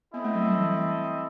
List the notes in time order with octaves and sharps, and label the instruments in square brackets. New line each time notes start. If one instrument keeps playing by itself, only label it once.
[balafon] B3 [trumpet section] C4 E4 A4 D#5
[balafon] A3
F#3
G3
E3